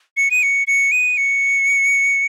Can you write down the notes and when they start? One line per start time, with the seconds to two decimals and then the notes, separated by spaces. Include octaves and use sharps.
0.17 C#7
0.31 D#7
0.43 C#7
0.67 C#7
0.92 D#7
1.17 C#7